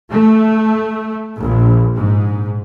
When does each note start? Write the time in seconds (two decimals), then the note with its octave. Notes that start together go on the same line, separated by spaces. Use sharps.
0.12 A3
1.41 A#1
1.97 G#2